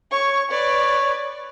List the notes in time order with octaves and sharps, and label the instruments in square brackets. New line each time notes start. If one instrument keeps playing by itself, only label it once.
[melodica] C#5 [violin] C#6
[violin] B4 D5 [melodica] C#5